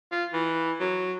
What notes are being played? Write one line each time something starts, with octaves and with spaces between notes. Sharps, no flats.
F4
E3
F#3